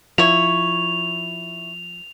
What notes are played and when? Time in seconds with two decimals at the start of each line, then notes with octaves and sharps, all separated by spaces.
0.18 F3 E4 C#5 F7